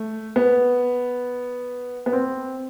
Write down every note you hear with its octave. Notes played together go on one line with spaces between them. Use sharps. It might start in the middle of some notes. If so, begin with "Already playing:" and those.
Already playing: A3
B3
B3
C4